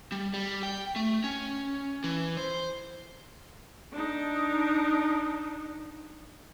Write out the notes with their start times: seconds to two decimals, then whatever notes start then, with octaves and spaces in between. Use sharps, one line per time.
0.12 G3
0.34 G3
0.63 G5
0.96 A3
1.24 C#4
2.04 E3
2.37 C5
3.93 D4 D#4